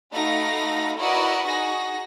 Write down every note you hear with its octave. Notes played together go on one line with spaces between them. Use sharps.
A3 D#4 F#4 F5 B5 A#6
E4 F#4 A#4 B4 D5 D#5
D#4 F#4 G#4 A#6